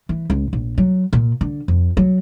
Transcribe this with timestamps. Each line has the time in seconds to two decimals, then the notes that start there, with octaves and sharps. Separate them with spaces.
0.09 E3
0.30 C#2
0.53 A#1
0.78 F#3
1.13 A#2
1.41 D3
1.68 F2
1.97 F#3